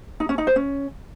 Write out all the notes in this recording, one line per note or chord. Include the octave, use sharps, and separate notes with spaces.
D#4
C#4
D#4
C5
C#4